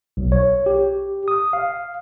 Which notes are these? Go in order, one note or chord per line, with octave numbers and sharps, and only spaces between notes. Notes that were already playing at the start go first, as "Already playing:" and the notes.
B1
C#5
G4
D#6
F5